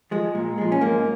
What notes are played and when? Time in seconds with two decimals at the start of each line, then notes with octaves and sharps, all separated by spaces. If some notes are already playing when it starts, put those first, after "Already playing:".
0.11 F3 G#3
0.35 A#2
0.58 F3 G#3
0.72 C#4
0.81 G#2 A#3